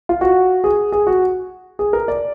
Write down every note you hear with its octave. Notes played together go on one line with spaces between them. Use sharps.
F4
F#4
G#4
G#4
F#4
G#4
A#4
D5